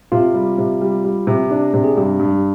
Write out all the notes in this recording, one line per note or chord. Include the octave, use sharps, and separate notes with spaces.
C3 F4
G3
C3
G3
G3
C3
D4
C3
G#4
G2 G4
G2